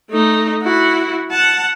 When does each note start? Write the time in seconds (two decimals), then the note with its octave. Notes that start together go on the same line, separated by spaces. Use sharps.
0.10 A3 D#4
0.63 E4 F#4
1.31 F#5 A5